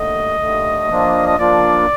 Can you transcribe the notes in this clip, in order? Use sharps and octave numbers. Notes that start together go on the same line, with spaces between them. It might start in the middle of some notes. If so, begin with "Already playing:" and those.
Already playing: D#2 D3 A3 D#5
D#2 D3 A3
F3 A#3 D4 F4
D#5
F3 A#3 D4 F4 D5